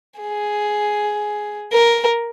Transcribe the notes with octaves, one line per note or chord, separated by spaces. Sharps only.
G#4
A#4